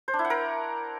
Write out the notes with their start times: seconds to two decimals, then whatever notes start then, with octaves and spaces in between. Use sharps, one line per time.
0.08 C5
0.13 D4
0.19 E4
0.25 F#5
0.30 A#4